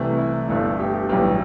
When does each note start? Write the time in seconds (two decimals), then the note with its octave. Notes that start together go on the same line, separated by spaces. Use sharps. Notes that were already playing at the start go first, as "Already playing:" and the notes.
Already playing: C2 C3 E3 A3
0.18 E4
0.48 G1 G2 D3 A3 E4
0.79 G4
0.94 G4
1.09 B1 A2 E3 G3 G4